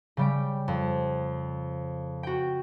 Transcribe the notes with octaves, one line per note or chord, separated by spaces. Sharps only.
C#3 G3 G5
F2
F#4 G5